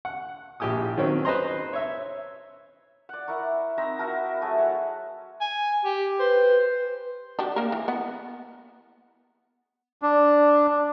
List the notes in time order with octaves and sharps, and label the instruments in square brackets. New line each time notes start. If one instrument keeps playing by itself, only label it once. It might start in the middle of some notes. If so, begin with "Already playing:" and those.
[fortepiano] F#5
A#1 E4 G4 G#5 D#6
D#3 F#3 C4 C#4
B4 C5 D#5 A#5 C6
C#5 E5
[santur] D5 F#5
E4 A#4 A#5 C#6
C4 D#4 E5 A#5
E4 F#4 A#4 A5
F#3 A3 G#4
C#5 F#5
[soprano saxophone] G#5
G4
[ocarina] B4 [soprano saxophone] C5
[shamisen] D4 F#4 G4
A#3 A#4
E3
B3 F#5
[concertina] D4